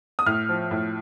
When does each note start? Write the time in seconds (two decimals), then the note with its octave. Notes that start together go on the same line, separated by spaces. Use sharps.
0.19 D#6
0.26 A2 F6
0.49 F3
0.71 A2